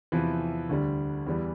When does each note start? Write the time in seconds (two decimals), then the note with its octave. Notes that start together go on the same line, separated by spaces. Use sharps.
0.12 E2 C3 E3 F3 E4
0.69 D2 D3 G3
1.27 E2 E3 G3